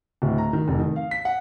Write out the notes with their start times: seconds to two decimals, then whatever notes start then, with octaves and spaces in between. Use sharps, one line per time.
0.22 D1
0.38 A#5
0.53 D#3
0.68 F1
0.79 D#3
0.96 F5
1.11 B6
1.25 F#5